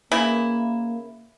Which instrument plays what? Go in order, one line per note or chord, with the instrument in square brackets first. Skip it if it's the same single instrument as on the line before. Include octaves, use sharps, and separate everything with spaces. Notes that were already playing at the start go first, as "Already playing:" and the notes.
[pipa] C#3 E3 E4 [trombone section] A#3